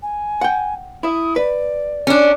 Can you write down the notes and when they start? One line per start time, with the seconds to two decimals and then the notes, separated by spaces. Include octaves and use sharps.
0.02 G#5
0.41 F#5 G5
1.03 E4 E5 D#6
1.36 B4 D5
2.07 C#4 D4